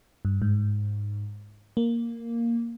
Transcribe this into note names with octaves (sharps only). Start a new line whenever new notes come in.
G2
G#2
A#3